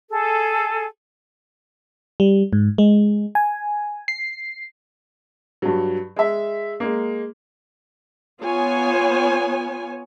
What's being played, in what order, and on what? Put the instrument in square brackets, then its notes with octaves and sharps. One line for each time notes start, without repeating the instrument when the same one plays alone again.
[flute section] G#4 A4
[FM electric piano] G3
G#2
G#3
G#5
C7
[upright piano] G2 F#3
G#3 E5
G#3 A#3
[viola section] B3 F4 C#5 G#5